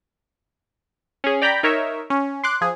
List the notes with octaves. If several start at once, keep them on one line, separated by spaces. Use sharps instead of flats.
C#4 G#4
D5 G5 A#5 B5 G6 B6
D#4 A#4 C#5 E5
C#4
C6 D6 F#6
F3 G#4